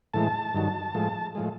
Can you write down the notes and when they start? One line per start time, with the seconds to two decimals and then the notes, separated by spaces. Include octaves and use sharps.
0.14 A2 E3 G#3 A5
0.54 G2 D#3 F#3
0.94 A2 F3 G#3
1.35 A2 F3 G#3